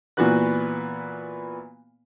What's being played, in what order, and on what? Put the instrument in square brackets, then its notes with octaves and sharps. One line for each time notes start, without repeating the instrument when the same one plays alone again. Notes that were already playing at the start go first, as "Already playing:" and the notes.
[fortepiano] A#2 E3 B3 F#4 B4 F#6